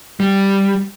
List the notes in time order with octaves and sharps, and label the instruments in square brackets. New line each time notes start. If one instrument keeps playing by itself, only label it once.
[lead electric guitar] G3